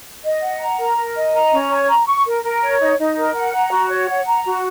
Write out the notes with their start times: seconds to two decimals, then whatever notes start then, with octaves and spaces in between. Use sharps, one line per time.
0.24 D#5
0.42 F#5
0.60 A#5
0.79 A#4
0.97 A#4
1.15 D#5
1.34 A#5
1.52 C#4
1.70 C#5
1.88 A#5
2.07 C#6
2.25 A#4
2.44 A#4
2.62 C#5
2.80 D#4
2.98 D#4
3.17 A#4
3.35 F#5
3.53 A#5
3.72 F#4
3.90 C#5
4.09 F#5
4.26 A#5
4.45 F#4